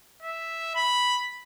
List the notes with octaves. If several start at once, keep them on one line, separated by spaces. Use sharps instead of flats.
E5
B5